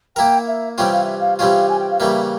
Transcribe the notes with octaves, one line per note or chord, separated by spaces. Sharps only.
A#3 E4 A#4 G5
E5
C3 E3 G3 C#4 F4 G5
F5
E5
F5
C3 E3 G3 C#4 F4 F5
G#5
G5
F5
C#3 E3 G3 A#3 E5